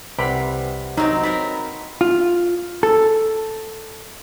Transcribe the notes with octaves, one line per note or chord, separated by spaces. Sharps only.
C2 C3 B4 F#5 G5 B5
F#3 C4 D#4 D#5 A#5
B3 C4 A#4 B5
F4
A4